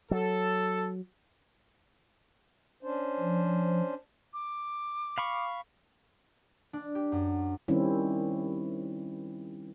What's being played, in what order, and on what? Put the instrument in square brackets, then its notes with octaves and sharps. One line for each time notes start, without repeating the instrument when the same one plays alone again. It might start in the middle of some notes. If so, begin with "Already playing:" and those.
[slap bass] F#3 [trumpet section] A4
[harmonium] C#4 D4 C5
[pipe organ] F3
[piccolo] D6
[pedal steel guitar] F5 B5 C#6
[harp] D4
G4
F#2
[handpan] D#3 G3 C4 C#4 E4